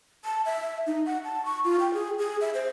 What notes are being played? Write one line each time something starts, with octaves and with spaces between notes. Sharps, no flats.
A5
E5
D#4
F#5
A5
C#6
F4
G5
G#4
G#4
E5
C5